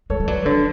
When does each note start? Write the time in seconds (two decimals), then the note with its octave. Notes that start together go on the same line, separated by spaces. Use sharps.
0.10 G#3 A4 C#5
0.20 G#3
0.28 F#3 B4 D5
0.45 D3 A4 C#5